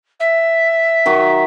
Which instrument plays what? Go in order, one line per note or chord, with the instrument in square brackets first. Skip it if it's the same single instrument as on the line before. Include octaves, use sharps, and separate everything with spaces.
[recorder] E5
[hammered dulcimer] D#3 F#3